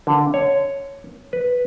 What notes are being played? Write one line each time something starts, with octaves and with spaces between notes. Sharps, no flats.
D3
C#5
B4